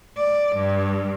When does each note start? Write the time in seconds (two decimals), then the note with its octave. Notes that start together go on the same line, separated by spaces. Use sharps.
0.17 D5
0.55 G2